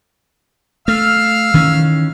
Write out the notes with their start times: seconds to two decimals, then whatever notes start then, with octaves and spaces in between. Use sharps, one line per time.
0.88 A3 F5 E6 F6
1.54 D#3 E3 C#4